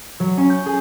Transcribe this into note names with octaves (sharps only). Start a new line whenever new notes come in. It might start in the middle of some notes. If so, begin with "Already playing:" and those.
F#3
C#4
G6
G#4